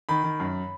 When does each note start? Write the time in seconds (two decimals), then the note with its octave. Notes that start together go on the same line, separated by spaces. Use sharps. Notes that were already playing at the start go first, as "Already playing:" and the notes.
0.09 D#3 B5
0.24 D#3
0.40 F#2